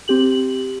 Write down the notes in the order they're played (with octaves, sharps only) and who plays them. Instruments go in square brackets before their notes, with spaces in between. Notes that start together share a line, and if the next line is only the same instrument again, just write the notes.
[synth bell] C4 G4 F#7